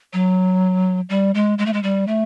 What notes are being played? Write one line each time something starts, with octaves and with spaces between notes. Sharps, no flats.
F#3
G3
G#3
G#3
A3
G#3
G3
A3